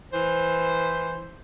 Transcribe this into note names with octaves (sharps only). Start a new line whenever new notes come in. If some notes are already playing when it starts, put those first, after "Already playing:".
E3 C5